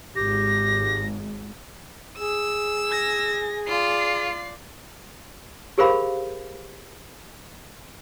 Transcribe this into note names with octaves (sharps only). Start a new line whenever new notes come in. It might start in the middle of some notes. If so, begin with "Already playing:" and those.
G#1 G#2 G4 A#6
G#4 E6
G#5 A#6
F4 D5 C7
G4 G#4 A#4 C5 F5 B5